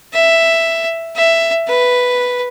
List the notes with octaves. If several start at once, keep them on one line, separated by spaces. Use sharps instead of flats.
E5
E5
B4